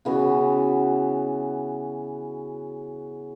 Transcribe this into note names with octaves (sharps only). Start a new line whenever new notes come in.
C#3 E3 B3 F#4